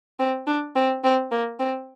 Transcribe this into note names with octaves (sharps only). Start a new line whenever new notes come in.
C4
D4
C4
C4
A#3
C4